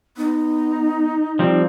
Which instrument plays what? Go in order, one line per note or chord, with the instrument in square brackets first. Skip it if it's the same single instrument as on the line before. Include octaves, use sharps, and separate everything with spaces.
[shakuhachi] B3 [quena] D#4
[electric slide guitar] F3 G3 C4